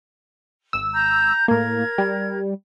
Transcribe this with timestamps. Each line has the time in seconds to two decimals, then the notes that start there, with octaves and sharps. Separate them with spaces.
0.73 G#1 E6
0.93 A#5 G6
1.48 A2 A#3 A#4 G#6
1.98 G3